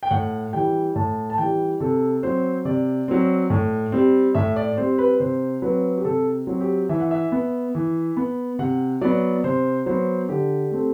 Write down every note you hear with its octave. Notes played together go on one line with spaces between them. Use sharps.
G5
A2 F#5
E3 G3 G5
A2 A5
A5
E3 G3 G5
C3 A4
F#3 C4 C5
C3 D5
F#3 C4
A2
G3 C4
A2 E5
D5
G3 C4 C5
B4
C3 C5
F#3 C4 B4
G4
C3 A4
F#3 C4
G4
E3 E5
F#5
E5
B3
E3
B3
C3 F#5
F#3 B3 D5
C3 C5
F#3 B3 C5
D3 G4
A3 C4